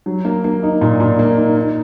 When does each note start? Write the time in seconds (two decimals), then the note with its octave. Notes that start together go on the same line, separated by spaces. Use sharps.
0.06 F#3
0.25 A#3
0.44 A#3
0.63 D#4
0.81 A#2
1.00 A#2
1.19 A#3
1.37 D#4
1.56 D#4